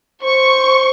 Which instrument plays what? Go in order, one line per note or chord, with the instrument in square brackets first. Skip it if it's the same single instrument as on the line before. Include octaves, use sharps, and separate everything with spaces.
[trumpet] C5 [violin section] C#6